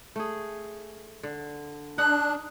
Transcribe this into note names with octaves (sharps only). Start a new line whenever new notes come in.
A3 G#4
D3
D4 D#4 F#6